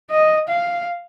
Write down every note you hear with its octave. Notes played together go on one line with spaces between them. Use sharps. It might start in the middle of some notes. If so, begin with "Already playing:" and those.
D#5
F5